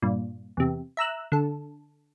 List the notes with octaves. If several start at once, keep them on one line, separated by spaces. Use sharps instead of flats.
G2 A#2
E2 C3
E5 A#5 E6 F#6
D3 A4